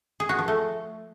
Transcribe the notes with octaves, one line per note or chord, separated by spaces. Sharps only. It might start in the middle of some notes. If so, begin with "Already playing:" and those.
G#4
F#4
F3
A3